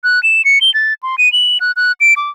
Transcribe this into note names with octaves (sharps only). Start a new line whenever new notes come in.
F#6
E7
C#7
G7
A6
C6
D#7
F#7
F#6
F#6
D7
D6